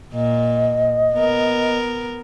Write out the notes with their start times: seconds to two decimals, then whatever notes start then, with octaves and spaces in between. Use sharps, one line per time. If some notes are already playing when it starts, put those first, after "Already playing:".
0.14 A#2 D#5
1.14 B3 A#4